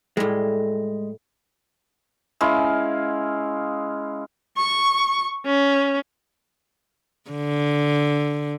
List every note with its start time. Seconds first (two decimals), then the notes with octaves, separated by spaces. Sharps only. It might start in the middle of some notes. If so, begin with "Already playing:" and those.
0.17 A2 G3 G#3
2.41 G#3 C#4 E4 F5
4.57 C#6
5.46 C#4
7.30 D3